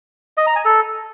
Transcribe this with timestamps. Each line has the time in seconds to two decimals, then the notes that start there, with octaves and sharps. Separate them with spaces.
0.37 D#5
0.47 A#5
0.56 G#5
0.65 A4